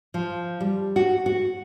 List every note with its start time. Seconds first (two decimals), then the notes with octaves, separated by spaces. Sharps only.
0.14 F3
0.60 G3
0.96 F#4
1.26 F#4